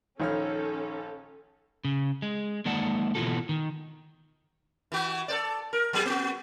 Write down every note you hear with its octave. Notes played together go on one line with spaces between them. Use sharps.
A#1 D#3 C#4 A4 C#5 F6
C#3
G#3
D#3 G#3 A#3 D5 F#5 A5
B2 E3 G#3 F4 F#4 A4
D#3
E3 F#4
A4 C5 D5
A#4
F#3 B3 G#4
B3 F#4